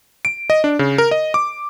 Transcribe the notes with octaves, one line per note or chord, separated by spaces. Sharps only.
D7
D#5
D4
C#3
A#4
D#5
D6